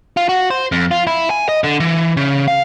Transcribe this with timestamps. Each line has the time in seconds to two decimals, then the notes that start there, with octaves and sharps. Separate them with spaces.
0.17 F4
0.29 F#4
0.50 C5
0.72 F2
0.91 F4
1.07 E4
1.30 G#5
1.49 D#5
1.64 D3
1.80 E3
2.17 C#3
2.48 F5